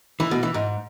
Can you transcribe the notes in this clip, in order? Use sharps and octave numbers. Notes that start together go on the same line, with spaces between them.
E3
B2
E3
G#2